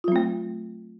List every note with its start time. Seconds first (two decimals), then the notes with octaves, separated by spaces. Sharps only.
0.04 F4
0.08 F#3
0.12 C4
0.16 A3